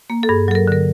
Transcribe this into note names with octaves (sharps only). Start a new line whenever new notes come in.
A#3
A4
G2 G#4
F#3 A4
A#4
D3 A#4